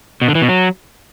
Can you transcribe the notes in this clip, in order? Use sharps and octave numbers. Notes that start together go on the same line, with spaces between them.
B2
D3
E3
B2
F#3